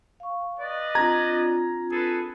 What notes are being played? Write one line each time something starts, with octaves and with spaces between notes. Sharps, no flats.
F5 C#6
B4 D5 D#5
C4 D4 F4 A#5 G#6
G#4 A4 B4